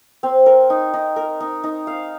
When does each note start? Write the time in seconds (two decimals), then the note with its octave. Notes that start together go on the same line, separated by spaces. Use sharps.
0.23 C4
0.46 A#4
0.70 D#4
0.94 D#4
1.16 A#4
1.40 D#4
1.64 D#4
1.87 F5